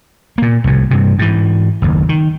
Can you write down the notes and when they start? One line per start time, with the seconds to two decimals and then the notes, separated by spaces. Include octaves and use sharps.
0.38 A#2 A#3
0.64 C2 A2
0.91 G2 C3
1.19 G#2 E3
1.82 F#1 D#2
2.09 D#3